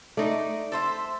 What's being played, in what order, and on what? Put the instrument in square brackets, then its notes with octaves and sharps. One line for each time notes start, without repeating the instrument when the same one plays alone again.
[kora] A3 [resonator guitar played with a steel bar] D#4 D5
[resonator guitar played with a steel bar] A4 C5 E5